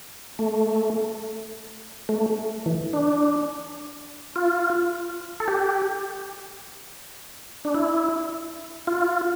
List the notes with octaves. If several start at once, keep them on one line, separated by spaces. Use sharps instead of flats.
A3
A3
E3
D4
F4
A4
G4
D4
E4
F4